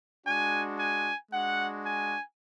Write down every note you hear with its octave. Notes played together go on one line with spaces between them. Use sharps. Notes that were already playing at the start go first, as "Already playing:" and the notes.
G#3 D4 F#4 G#5
G#5
G#3 D4 F#4 F#5
G#5